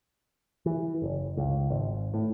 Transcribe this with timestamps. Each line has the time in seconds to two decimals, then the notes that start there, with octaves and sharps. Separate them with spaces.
0.66 E3
1.02 F#1
1.37 C#2
1.70 G#1
2.14 A2